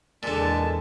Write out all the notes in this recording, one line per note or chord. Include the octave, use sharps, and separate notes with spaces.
E2 A#2 D3 G#3 A5